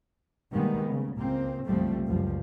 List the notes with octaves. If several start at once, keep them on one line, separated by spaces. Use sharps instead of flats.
B2 D#3 G3 G#3 A#3 B3
C#3
C#2 A#3 C4
F#1 C2 F3 G3 A3 C4
C#2 F#2 F3 G3